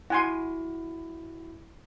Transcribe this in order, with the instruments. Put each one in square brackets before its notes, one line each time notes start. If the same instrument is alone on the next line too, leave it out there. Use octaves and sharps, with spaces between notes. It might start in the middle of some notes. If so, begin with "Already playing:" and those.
[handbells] E4 F#4 [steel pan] F#5 G#5 C6